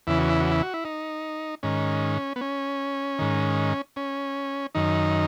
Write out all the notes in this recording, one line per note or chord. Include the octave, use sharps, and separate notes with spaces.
E2 C#3 E3 E4
F#4
E4
F#4
E4
F#4
E4
D#4
G#2 D#3 C#4
B3
C#4
G#2 D#3
C#4
F#2 D#3 D#4